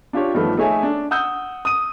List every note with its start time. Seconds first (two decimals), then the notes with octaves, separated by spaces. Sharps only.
0.13 D4 F4 G4 C#5
0.34 G2 D#3 F3 A3 B3
0.57 A3 D#4 G#4 C#5 E5 G#5
0.83 D4
1.11 F#5 D#6 E6 G6
1.65 D#6 D#7